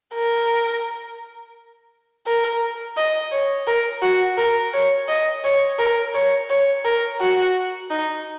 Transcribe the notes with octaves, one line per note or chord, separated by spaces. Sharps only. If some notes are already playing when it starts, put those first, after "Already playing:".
A#4
A#4
D#5
C#5
A#4
F#4
A#4
C#5
D#5
C#5
A#4
C#5
C#5
A#4
F#4
D#4